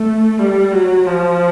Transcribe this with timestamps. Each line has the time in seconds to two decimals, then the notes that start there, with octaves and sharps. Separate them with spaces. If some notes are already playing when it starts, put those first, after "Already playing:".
Already playing: A3
0.39 G3
0.73 F#3
1.06 F3